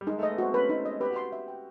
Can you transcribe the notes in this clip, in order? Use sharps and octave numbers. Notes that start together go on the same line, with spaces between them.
G3
G#3 D#4
A3 D#5
B3
C4 F#4
C#4 B4
D#4
D#5
G4 B4
F#4
G4 C6
E5
G5